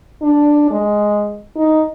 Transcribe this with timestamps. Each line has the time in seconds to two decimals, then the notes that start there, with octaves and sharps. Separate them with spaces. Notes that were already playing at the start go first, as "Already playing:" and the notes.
0.22 D4
0.71 G#3
1.56 D#4